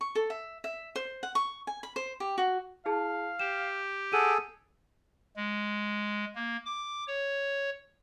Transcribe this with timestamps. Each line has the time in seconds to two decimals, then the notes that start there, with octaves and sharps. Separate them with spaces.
0.01 C#6
0.15 A4
0.30 E5
0.64 E5
0.96 C5
1.23 F#5
1.35 C#6
1.67 G#5
1.83 B5
1.96 C5
2.20 G4
2.38 F#4
2.86 E4 G#4 F5 A5
3.39 G4 E7
4.13 G#4 A4 F#5 D#7
5.36 G#3
6.35 A#3
6.66 D6
7.07 C#5